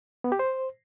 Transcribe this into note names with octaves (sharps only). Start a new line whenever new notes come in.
B3
G4
C5